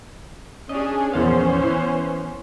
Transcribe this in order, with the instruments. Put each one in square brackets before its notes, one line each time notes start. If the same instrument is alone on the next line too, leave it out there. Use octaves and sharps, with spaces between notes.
[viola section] C#4 D4 G#4 [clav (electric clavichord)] D#5
[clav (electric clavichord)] A#1 E2 F5 [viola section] B3 C#4 C5
[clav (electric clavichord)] E3